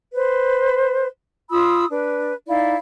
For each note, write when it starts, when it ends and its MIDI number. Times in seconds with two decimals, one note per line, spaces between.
0.14 1.06 71
0.14 1.06 72
1.51 1.84 65
1.51 1.84 83
1.51 1.84 87
1.51 1.84 88
1.90 2.33 62
1.90 2.33 71
2.48 2.76 63
2.48 2.76 64
2.48 2.76 74
2.48 2.76 77